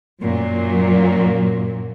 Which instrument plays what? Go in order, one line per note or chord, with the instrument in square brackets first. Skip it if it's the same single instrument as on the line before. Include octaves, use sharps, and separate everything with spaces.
[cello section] F#2 A#2 F#3